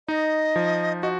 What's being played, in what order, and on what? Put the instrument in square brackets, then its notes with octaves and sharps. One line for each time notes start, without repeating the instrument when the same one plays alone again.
[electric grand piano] D#4 [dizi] D#5
[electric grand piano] F3
[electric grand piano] F#4 [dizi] D#5